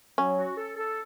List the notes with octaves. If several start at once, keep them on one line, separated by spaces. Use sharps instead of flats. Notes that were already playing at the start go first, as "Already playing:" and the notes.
F#3 C#4
F#4
A4
A4